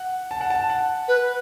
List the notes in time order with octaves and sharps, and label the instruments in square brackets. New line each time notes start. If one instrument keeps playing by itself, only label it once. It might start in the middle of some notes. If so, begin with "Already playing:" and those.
Already playing: [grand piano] F#5
A5
F#5
A5
F#5
[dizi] B4